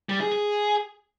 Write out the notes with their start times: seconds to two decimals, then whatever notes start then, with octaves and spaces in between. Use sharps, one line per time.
0.09 G3
0.21 G#4
0.32 G#4